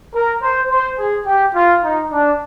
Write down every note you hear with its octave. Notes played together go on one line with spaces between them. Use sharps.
A#4
C5
C5
G#4
G4
F4
D#4
D4